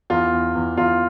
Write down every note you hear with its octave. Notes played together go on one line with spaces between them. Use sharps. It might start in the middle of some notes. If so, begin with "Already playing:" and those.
E2 F4
E2
E2
E2 F4